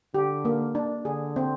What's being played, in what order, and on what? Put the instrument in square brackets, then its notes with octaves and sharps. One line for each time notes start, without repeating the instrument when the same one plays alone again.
[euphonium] D3 [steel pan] G4
[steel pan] A#3
D4
[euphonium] D3 [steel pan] G#4
[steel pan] C4